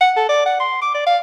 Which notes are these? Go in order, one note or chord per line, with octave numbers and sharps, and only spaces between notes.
F#5
A4
D5
F#5
C6
D6
D5
F5